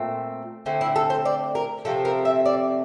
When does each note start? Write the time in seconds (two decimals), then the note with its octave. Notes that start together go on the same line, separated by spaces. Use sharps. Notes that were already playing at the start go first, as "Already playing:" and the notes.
Already playing: A#2 A3 C4
0.66 D3 A3 C4
0.81 E4
0.96 A4
1.10 C5
1.25 D5
1.55 A#4
1.85 C3 F3 A3 C4 A4
2.05 A#4
2.25 E5
2.46 D5